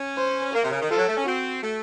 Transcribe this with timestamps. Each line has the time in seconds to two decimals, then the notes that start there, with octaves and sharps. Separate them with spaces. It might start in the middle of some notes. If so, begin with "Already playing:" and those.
Already playing: C#4
0.17 C5
0.53 A#3 A#4
0.63 C3
0.71 C#3
0.81 D#3
0.90 F3 A4
0.98 F#3
1.08 A3
1.16 C#4
1.26 C4 F#4
1.62 A3